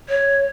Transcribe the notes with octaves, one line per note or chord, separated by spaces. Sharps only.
C#5